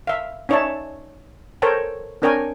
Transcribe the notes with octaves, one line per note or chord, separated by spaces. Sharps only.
E5 F5
C#4 D#4 C#5 D5 E5 A5
A4 A#4 C5 C#5 G5 A5
C4 D4 A#4 C#5 G5 G#5